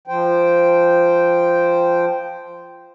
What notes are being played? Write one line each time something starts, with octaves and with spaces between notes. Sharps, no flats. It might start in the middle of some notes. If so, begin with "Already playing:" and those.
F3 C5 G5